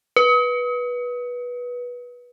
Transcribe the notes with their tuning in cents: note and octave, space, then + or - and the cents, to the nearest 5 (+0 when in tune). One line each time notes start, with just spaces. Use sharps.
B4 -15